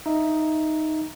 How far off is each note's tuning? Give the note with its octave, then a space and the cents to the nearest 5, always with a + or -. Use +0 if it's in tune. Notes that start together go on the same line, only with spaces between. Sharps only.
D#4 +0 E5 +5